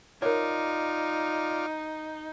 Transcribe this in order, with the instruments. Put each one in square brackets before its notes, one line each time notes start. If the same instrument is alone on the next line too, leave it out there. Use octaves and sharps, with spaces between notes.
[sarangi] D#4 [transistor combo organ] F4 D5 [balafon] A#4 C#5